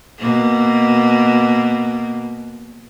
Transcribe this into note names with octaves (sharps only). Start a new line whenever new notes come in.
B2 A#3